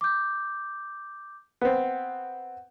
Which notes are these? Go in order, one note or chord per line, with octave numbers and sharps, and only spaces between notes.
D6 G6
B3 C4 F#5